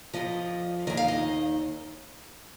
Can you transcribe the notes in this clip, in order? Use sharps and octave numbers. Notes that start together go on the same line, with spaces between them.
F2 F3 D#5
D#2 D#3 D#5
F5
D#5